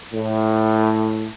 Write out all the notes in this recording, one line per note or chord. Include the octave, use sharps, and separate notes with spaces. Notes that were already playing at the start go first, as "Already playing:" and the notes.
A2